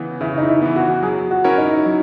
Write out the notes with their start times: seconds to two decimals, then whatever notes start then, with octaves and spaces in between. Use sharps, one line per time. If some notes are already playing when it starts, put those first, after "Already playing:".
Already playing: C#3 E3 B3
0.21 C#3 E4
0.38 D#4
0.48 E4
0.62 E3 B3
0.76 F#4
1.03 F#3 G#4
1.31 F#4
1.44 C#4 E4 A#4 C#5
1.58 D#4
1.86 F#3